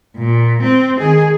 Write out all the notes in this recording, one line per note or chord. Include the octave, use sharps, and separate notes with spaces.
A#2
C4
D#3 G#4